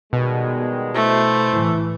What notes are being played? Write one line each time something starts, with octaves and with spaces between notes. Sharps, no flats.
B2 D#3 G3 G#3
A3 E4 C5
A2 E3